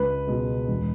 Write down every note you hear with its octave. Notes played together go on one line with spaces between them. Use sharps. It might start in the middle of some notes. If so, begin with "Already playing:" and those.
Already playing: C#2 B4
B2 G#3
E1